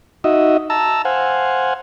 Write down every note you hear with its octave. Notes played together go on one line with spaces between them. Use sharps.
D#4 F#4 D#5 E5
A5 A#5 E6
C5 F5 F#5 G#5